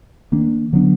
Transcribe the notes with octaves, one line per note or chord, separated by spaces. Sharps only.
D#3 A#3 D4
D3 F#3 B3 D4